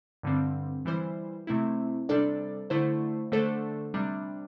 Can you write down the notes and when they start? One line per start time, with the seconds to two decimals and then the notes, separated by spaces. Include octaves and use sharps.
0.23 G2 D3 G3 C4
0.85 E3 G3 E4 C5
1.47 C3 A3 C4 E4
2.09 C3 G3 D4 A4 D5
2.70 D3 A3 E4 C5
3.32 D3 A3 D4 A4 C5
3.94 C3 G3 D4